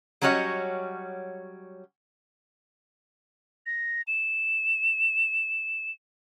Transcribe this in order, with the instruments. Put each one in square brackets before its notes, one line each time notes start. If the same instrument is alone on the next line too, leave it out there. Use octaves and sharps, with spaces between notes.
[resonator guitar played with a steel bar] F#3 G3 C#4 F#4 C#5 D#5
[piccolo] A#6
E7